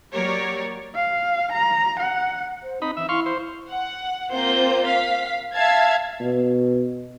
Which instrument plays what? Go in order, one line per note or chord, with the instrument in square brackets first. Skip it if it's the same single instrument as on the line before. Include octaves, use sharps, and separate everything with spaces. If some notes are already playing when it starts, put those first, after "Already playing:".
[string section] F#3 A#3 G4 A#4 C#5 D5
[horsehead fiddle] F5
A#5
F#5
[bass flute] C5
[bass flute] C4 [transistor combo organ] D#4 B5
[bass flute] E3 [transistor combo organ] E5
[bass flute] E4 [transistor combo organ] F5 C6 C#6
[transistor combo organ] C5
[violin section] F#5
A#3 C4 F4 C5 G6
F5 B6
E5 F5 A5 G#6
[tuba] B2